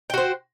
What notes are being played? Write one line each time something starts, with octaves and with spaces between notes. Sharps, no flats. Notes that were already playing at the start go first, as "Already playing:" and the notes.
F#4 C5 G5